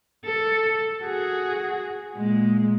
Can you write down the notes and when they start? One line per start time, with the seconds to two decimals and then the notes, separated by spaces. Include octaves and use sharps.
0.25 A4
1.03 F#4 G#4
2.16 A#2 G#3